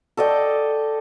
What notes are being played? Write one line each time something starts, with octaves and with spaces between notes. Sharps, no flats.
A4 D5 D#5 G5